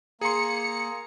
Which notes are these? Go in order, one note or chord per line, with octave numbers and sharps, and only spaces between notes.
A#3 G#4 A#5 C6 C#7